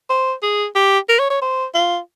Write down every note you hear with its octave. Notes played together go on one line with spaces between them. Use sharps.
C5
G#4
G4
A#4
C#5
C#5
C5
F4